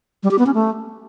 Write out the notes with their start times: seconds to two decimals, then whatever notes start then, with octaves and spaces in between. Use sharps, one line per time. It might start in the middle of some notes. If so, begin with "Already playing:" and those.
0.23 G3
0.31 G4
0.39 B3
0.46 C#4
0.54 A3